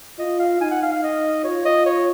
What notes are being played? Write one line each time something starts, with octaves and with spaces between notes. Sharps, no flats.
F4 D#5
F5
D#4 G#5
F#5
F5
F5
D#5
F4 C#5
D#5
C#5